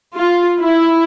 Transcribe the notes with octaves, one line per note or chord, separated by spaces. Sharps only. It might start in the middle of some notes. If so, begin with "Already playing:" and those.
F4
E4